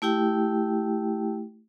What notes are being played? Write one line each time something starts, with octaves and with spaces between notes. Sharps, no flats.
A3 E4 G4 G5